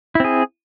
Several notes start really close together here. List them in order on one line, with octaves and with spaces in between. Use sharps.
E4 C4 G#4